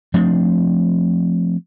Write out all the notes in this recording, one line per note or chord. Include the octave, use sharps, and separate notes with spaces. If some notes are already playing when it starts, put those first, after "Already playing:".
F3 A3 C4 D4